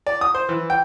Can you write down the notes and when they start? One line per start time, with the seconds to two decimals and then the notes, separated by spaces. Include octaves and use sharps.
0.07 D5
0.21 D#6
0.35 C5
0.49 E3
0.70 G5